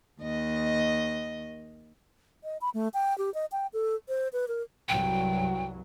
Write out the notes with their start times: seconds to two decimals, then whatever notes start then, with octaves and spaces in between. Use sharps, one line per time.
0.21 D#2 D#5
2.44 D#5
2.61 B5
2.74 A3
2.94 G5
3.18 G4
3.34 D#5
3.52 G5
3.73 A4
4.08 C5
4.33 B4
4.48 A#4
4.88 C2 G2 F#3 G5